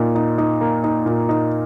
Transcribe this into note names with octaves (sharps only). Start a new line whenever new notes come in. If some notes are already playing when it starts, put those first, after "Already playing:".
Already playing: A#2 D#4
D#4
D#4
A#3
D#4
A#2
D#4